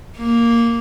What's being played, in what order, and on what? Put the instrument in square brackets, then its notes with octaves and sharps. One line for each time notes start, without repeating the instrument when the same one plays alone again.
[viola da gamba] A#3